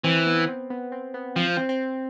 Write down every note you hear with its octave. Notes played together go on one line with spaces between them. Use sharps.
E3 C4
B3
C4
B3
C4
B3
F3 C4
C4
C4